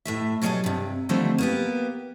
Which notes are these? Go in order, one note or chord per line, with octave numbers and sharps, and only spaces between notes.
A2 A3 E5
B2 F#3 G3 F4 G#4 A4
G2 C3
D3 D#3 F3 G3 A3 C4
A#3 B3 G4